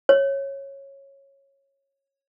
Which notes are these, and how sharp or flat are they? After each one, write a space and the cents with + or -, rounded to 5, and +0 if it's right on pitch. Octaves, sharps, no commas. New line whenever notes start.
C#5 -10